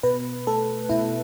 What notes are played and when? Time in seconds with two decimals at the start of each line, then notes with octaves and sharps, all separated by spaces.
0.03 B2 B4
0.47 A3 A4
0.89 B2 E4